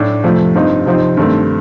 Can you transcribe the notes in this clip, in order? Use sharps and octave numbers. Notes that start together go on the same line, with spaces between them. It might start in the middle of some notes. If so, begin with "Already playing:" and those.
Already playing: A2 A3 D4
F2 C3 F3 A3
G2 F3 C4 D#4
C3 F3 C4 D#4
G2 D#3 A3 C4